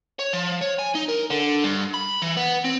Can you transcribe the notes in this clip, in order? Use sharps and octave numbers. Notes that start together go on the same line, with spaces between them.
C#5
F3
C#5
G#5
D#4
A#4
D3
G2
B5
E3
B3
C4